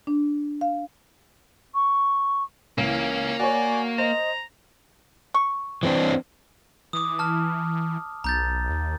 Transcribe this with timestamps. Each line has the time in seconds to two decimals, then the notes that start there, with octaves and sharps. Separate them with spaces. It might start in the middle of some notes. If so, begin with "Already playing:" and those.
0.07 D4
0.61 F5
1.74 C#6
2.78 C#2 E3 A#3 C#4
3.39 F#4 C#5 D5 G#5
3.99 C5 D#5 A#5
5.34 C#6
5.83 E3 C4 D4
6.93 E3 D6 D#6
7.19 A5 F6
8.24 B1 A#5 G6 A6
8.69 D#2